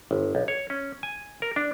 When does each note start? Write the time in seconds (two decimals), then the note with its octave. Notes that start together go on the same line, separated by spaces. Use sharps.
0.11 G1
0.35 B1
0.48 C#5
0.70 C#4
1.03 G#5
1.42 A#4
1.56 D4